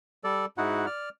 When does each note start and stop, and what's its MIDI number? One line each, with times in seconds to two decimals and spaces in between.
0.24 0.46 55
0.24 0.46 69
0.24 0.46 74
0.58 0.86 44
0.58 0.86 63
0.58 0.86 64
0.58 0.86 66
0.58 0.86 78
0.86 1.09 74
0.86 1.09 89